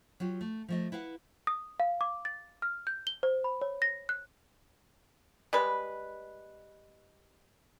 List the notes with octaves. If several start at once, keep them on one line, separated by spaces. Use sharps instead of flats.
F#3 F4 G4
A3
F3 A3 D#5
E4 B4 F5 F#5
D#6
F5
D6
A6
F6
G6
G7
C5
B5
C#5
A#6
F#6
G3 G#3 B4